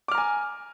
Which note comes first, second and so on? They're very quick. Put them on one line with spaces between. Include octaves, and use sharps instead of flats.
D6 F6 A#5 G#5